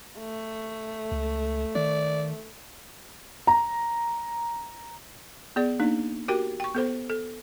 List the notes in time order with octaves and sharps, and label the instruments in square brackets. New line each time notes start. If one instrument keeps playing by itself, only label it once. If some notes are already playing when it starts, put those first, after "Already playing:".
[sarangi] A3
[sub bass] C#2
[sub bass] D#3 [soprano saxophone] D5
[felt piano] A#5
[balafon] B3 G#4 D5
A#3 D4 D#4
F#4 G4 A#4 G5
G5 C#6
B3 A4 C5
A4